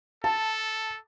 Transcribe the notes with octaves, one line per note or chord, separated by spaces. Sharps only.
A4 A5